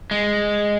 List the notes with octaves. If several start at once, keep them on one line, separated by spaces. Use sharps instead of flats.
G#3